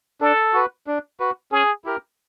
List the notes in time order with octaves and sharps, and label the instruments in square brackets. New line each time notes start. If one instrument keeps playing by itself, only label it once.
[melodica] D4 [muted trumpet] A4
[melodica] F#4 B4
D4
F#4 B4
[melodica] C#4 [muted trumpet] G#4
[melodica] E4 G4 A#4